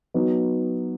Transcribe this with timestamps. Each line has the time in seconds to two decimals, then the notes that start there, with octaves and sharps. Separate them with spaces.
0.14 F#3 B3 D#4